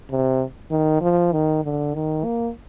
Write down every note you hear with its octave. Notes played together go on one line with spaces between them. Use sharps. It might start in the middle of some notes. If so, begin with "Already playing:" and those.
C3
D#3
F3
D#3
D3
D#3
A#3